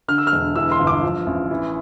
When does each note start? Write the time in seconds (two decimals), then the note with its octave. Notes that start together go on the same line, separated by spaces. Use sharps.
0.08 D3 F6
0.18 E6
0.27 F6
0.32 E1
0.56 E3 E6
0.72 C6
0.79 G1
0.87 D6
1.03 F3
1.26 A1
1.50 E3